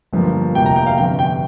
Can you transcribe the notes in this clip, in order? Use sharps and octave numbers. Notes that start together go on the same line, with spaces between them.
G1 G2 F3 A#3
F1 F2 C3 A#3 G5
A#5
G5
F5
G1 F2 C3 G5
G5